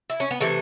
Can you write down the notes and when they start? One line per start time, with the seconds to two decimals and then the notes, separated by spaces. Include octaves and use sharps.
0.10 E4
0.20 C#4
0.31 B3
0.40 C3 E3 A3